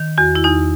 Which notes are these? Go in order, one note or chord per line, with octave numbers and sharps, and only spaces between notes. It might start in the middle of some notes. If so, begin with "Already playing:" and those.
Already playing: D#3
E2 F#4
E4
E2 D#4